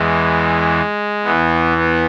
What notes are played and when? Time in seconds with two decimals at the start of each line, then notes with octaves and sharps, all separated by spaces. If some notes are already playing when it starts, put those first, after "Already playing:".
Already playing: E2 E3 G#3
1.24 E2 E3 B3
1.77 B3